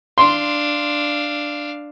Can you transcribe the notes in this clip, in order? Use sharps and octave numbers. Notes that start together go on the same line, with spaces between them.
D4 F5 C6